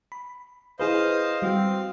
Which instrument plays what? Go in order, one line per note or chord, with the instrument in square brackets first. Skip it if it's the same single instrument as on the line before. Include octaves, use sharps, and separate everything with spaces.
[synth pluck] B5
[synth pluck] E4 G#4 B4 [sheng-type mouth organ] C5 D#5 F5
[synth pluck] G3 F#4 [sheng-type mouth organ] C4 F5